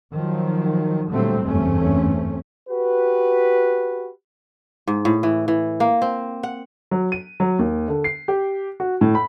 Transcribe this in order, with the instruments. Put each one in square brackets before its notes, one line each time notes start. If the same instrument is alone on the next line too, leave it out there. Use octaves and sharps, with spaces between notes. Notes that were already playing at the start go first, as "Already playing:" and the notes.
[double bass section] D#3 F3 F#3
A#2 D3 F#3 G3 A3 C4
F#1 E2 G2 A3 C4 C#4
[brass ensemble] F#4 G4 B4
[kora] G#2
A2
E3
E3
A#3
C4
F#5
[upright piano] F#3
D#7
F#3
D#2
D3
C7
G4
F#4
A2
B5